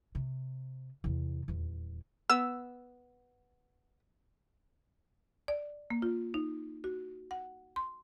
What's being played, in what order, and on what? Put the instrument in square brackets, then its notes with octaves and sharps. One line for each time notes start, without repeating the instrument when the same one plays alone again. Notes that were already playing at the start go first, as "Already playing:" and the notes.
[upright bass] C3
E2 C3
D#1 E2
[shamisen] B3 [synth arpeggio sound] E6
[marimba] D5
A#3
F4
D#4
F#4
F#5
C6